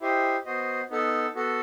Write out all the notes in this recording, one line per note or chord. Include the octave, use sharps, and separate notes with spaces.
E4 G4 C5 D#5
B3 F#4 C5 D#5
B3 D#4 A4
B3 F#4 A4